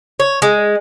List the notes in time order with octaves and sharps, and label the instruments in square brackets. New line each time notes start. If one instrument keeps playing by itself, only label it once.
[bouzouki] C#5
G#3